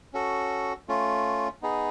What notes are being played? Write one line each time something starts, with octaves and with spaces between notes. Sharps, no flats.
C#4 F#4 A4
A3 C#4 F4
B3 D#4 G#4